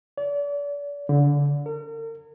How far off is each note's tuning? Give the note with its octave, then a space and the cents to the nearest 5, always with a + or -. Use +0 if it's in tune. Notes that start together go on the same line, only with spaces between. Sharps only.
D5 -40
D3 -25
A#4 -45